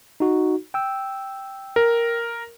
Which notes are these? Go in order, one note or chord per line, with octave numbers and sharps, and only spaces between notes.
D#4 F#4
G5 E6
A#4